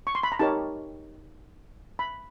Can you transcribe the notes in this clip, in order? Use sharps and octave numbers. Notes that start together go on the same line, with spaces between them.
C#6
C6
B5
A#5
D#4 G4 A#4 C#5 A5
B5